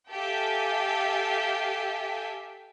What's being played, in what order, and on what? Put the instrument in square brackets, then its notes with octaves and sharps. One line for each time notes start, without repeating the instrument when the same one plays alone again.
[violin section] G4 A4 E5 F5 G5 G#5